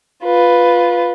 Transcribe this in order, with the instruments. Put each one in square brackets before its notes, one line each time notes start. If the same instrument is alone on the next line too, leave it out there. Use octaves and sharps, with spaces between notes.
[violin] F4 B4